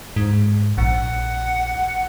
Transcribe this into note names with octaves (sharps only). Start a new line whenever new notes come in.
G#2
A#1 F#5